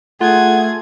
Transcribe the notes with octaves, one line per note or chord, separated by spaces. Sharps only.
A3 F4 G#4 F#5 G#6